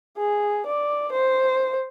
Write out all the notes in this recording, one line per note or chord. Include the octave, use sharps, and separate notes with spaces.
G#4
D5
C5